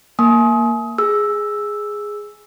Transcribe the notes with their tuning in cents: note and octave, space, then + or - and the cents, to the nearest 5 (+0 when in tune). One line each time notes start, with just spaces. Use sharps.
A#3 +0 G#5 +35 D#6 +25
G#4 +0 E6 +0